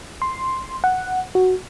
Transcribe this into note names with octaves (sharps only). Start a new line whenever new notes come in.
C6
F#5
F#4